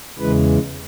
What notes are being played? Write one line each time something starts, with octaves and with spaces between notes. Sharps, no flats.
E2 C#3 E3 G#3 B4